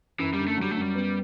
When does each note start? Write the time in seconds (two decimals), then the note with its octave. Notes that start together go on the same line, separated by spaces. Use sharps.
0.19 F#2 E3
0.34 D3 G3
0.47 A3
0.57 F#3
0.62 G3
0.71 A3
0.77 F#2 G3
0.95 B3